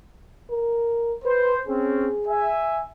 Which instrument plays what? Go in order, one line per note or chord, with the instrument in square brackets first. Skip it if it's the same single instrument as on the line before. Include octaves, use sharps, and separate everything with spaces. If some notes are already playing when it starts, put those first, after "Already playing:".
[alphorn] A#4
[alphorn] B4 [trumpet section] C5
[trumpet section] C4 C#4 [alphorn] G#4
[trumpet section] E5 G#5